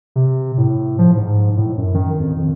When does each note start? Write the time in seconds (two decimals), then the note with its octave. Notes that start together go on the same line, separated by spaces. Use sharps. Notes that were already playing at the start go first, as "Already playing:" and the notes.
0.16 C3
0.58 A2
0.99 F3
1.17 G#2
1.57 A2
1.78 F#2
1.95 D#3
2.20 F2
2.38 F2